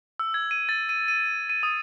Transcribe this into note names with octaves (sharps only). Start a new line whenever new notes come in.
E6
G#6
D#7
A6
D#7
D#7
D#7
D#6